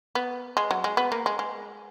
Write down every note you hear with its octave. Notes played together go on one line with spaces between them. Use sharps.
B3
G#3
F#3
G#3
B3
A#3
G#3
G#3